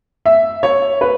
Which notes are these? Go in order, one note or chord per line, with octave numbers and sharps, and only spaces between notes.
E5
C#5
B4